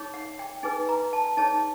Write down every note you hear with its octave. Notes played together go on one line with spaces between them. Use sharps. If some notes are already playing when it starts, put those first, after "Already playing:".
Already playing: D#4 G#4 C#5
F#5
G5
D#4 G#4 B4 G#5
A#5
A5
D#4 G#4 C#5 A5